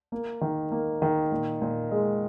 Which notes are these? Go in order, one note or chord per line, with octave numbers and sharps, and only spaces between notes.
A#3
D#3
A#3
D#3
A#2
A#2
G#3